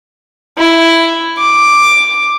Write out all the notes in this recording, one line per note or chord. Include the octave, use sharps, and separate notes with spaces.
E4
D6